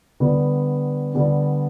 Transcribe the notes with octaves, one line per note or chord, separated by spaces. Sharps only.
D3 G3 B3
D3 G3 B3